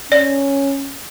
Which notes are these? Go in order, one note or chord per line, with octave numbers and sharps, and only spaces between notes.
C#4 D5